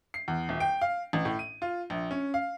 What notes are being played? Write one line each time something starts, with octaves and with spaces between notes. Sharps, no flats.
C7
E2
D#1
G5
F5
A1
A2
D#7
F4
A#1
C#4
F5